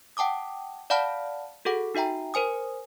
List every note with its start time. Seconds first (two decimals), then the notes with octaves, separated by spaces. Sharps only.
0.17 F#5 G5 A5 D6 D#6
0.90 D5 F5 F#5 A5 B5 F6
1.65 F#4 G#4 A4 F#5
1.95 D#4 F#4 E5 G5 A#5
2.34 A#4 C5 G#5 D#6